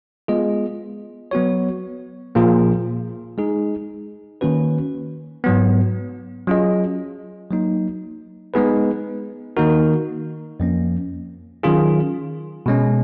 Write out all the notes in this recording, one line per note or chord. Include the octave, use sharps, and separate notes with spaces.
G#3 B3 F4 G#4 D#5
F#3 B3 F#4 C#5
A#2 F3 A#3 F4 G#4
G#3 D#4 G#4
D#3 A#3 C#4 F#4 B4
G#2 F#3 B3
F#3 C#4 F4 G#4 D#5
F#3 A#3 D#4
G#3 B3 D#4 G#4 B4
D#3 A#3 D#4 F#4 A#4
F2 F3 A#3 C#4
D#3 F#3 C#4 F4 G#4
B2 G#3 C#4